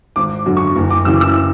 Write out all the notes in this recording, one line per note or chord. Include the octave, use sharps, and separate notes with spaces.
G#1 D6
F#2 D3 F#3
C#6
F#1
D6
F#2 C#3 E3 E6
E6